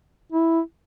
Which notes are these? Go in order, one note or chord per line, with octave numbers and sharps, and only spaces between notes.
E4